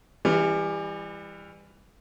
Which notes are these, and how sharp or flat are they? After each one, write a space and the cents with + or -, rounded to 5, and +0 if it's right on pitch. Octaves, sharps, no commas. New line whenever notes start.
E3 +0 G3 +30